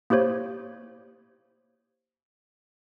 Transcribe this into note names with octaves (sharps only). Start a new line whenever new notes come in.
A#3 E4 G4 C5 C#5